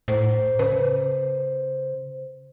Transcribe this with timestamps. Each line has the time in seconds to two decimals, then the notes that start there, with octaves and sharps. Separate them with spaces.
0.08 A2 C5
0.59 C#3 B4